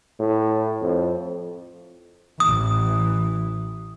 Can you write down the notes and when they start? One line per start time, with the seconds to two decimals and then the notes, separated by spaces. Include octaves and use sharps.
0.20 A2
0.82 F2
2.40 A1 E3 D#6